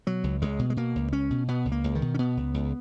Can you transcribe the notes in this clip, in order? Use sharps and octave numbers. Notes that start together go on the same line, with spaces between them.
B2 F#3
C#2
C#2 G#3
B2
G#3
B2 A#3
C#2
C#2 C#4
B2
B2 B3
C#2
A#3
C#2
D#3
B2
C#4
B2 B3
C#2
C#2